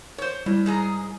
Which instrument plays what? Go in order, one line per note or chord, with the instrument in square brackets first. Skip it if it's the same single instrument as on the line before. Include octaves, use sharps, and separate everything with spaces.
[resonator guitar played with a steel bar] C5 C#5
[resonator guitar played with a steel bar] A2 [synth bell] G3 E4
[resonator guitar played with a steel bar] G#2 G#4 A#5